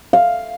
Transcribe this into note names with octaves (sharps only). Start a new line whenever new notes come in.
F5